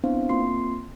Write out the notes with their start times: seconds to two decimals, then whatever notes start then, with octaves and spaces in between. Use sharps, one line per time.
0.04 B3 C4 D4 E4 C5 F5
0.29 A#3 C4 F4 C6 C7